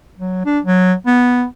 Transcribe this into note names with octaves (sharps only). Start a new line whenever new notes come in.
F#3
D4
F#3
B3